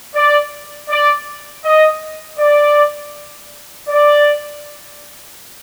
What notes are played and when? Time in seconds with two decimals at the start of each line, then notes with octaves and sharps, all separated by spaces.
0.16 D5
0.90 D5
1.65 D#5
2.39 D5
3.89 D5